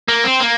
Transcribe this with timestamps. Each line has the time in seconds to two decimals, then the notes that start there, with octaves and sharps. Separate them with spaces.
0.09 A#3
0.24 C4
0.40 A#3